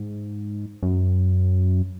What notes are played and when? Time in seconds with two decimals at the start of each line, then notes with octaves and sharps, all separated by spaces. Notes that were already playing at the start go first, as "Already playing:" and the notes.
Already playing: G#2
0.83 F#2